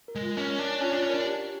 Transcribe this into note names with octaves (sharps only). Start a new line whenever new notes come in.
A#4
G#3
F4
C#4 A#4
C#5
D4
C#5
C#4 F4
D4 F4
C#4
D4 A#4
G4
G4